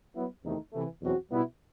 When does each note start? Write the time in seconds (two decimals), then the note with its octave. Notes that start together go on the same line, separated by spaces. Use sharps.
0.16 F#3 B3 E4
0.44 E2 C3 D#3 A3 D#4
0.73 C3 E3 A3
1.01 E2 B2 F#3 C4 F#4
1.30 B2 G3 B3 E4